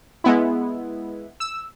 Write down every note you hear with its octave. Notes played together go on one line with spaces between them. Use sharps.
G#3 B3 E4
E6